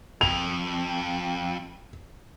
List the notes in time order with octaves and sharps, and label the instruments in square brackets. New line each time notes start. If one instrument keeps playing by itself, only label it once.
[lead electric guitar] F2 [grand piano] F7